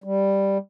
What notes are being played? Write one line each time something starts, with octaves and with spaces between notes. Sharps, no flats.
G3